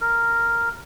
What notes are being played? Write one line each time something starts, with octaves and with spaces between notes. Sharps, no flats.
A#4